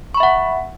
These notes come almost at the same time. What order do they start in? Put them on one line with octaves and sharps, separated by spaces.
C#6 B5 E5 F#5